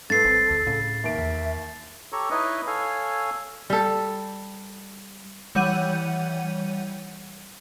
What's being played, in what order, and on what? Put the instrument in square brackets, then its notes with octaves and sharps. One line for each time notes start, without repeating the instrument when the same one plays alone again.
[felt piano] G2 B4 [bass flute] A4 [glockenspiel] A6 C7
[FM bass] G#1 [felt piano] C4
[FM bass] D2
[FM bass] A2 [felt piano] C#3
[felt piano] D#2 A#3 D7 [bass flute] E5
[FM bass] E2
[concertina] G4 A4 C#5 A#5 C#6
D#4 E4 B4 C#5 D#5
A4 C#5 F5 G#5
[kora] G3 A4
[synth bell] E3 G3 C#5 F#5 G6 D#7